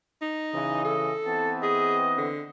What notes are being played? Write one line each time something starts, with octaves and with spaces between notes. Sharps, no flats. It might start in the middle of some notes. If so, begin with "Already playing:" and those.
D#4
C#3 E3 D#5
A4
E3 B3 C4 A5
G#4 D#5
D3